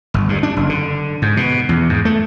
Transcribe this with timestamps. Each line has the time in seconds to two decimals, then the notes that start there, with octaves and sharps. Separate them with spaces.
0.14 G1
0.29 G2
0.43 D4
0.57 F#1
0.69 D3
1.22 G#2
1.37 B2
1.69 E2
1.89 G#2
2.05 A3